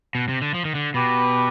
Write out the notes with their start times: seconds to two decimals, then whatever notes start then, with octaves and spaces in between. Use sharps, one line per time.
0.15 B2
0.28 C3
0.42 D3
0.54 F3
0.65 D#3
0.75 D3
0.94 B2 G4 B4